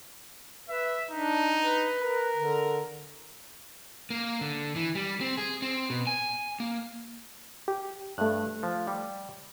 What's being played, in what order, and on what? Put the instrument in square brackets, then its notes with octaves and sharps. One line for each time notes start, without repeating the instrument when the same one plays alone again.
[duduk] B4 [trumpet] E5
[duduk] D4 [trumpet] D#4
[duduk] B4
[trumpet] A#4
[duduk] D3
[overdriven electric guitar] A#3
D3
E3
G3
C4
G#4
C4
B2
G#5
A#3
[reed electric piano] G4
[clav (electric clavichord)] G2 [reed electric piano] A3 F#6
[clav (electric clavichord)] F3
G3